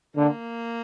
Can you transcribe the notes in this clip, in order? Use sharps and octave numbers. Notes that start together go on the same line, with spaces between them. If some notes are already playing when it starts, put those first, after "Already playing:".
D3 A#3